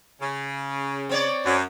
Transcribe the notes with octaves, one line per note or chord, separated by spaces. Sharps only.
C#3
C4 C#5 D5
F#2